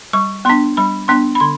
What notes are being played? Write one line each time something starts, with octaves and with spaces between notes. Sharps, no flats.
G3 C#6
B3 D4 C6
G3 B5
B3 D4 C6
B5
D3 C6